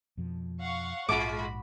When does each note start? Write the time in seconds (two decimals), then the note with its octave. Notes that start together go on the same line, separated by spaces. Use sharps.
0.17 F2 B2 F3
0.60 F5 F#5 C#6
1.09 A#1 G#2 G#3 F4 F#4 B5 D6